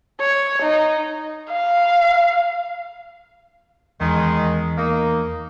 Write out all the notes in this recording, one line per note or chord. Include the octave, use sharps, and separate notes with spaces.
C#5
D#4
F5
E2 D#3 G#3
A#3 D#4